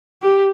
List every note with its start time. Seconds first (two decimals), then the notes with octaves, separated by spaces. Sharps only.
0.22 G4